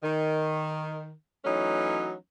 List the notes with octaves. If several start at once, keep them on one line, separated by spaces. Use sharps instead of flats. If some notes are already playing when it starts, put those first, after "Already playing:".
D#3
E3 F#3 A3 C#4 D#4